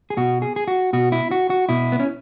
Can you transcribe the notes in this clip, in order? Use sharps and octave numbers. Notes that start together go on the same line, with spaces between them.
G#4
B2 F#4
G#4
G#4
F#4
B2 F#4
E4
F#4
F#4
B2 E4
B3
C#4